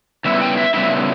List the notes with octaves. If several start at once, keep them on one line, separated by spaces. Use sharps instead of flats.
C#3 G3 B3 E4 E5
G5
E5
C#3 G3 B3 E4 E5